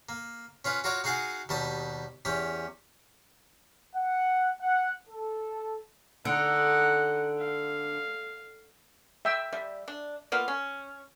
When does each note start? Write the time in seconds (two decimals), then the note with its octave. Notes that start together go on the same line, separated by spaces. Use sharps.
0.09 A#3
0.65 C#4 F4 B4
0.84 F4 F#4 A#4 C#5 D6
1.04 D#4 F#4 G#4 F5 F#5 G#5
1.49 D#2 B2 G3 A5 D#6
2.25 E2 C#4 G4
3.95 F#5
4.60 F#5
5.10 A4
6.25 D3 D#4 F#5
7.40 F5
9.25 E5 G5 E6
9.53 G3 E5
9.88 D4
10.32 A#3 B3 F4
10.48 C#4